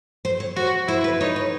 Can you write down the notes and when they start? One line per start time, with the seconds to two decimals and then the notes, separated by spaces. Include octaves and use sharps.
0.25 C5
0.40 C#5
0.56 F#4 C5
0.88 E4 C5
1.04 B4
1.20 D#4 C#5
1.36 B4